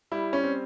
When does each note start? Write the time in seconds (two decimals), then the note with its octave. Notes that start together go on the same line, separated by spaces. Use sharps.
0.12 G3 E4
0.33 C#4
0.44 C4